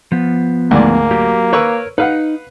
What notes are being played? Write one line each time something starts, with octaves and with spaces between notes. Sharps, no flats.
F3 B3
D2 G#2 A#3 D5
F#3 G4
A#4 B4 C#5 C#6 E6
D#4 B4 F5 F#5